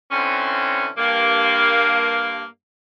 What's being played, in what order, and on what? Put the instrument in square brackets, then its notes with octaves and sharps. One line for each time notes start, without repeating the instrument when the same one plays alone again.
[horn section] D3 E3 C4 C#4
G2 A#3